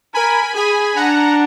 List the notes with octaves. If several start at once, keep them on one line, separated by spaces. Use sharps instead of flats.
A#4 G#5 B5
G#4 G#5 B5
D4 F#5 A#5